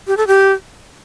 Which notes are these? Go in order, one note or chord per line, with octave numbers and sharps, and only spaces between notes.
G4
A4
G4